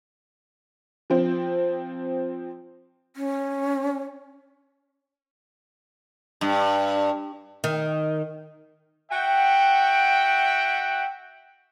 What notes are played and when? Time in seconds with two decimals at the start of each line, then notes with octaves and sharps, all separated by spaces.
1.10 F3 C4
3.16 C#4
6.41 G2
7.64 D#3
9.11 F#4 E5 F#5 G5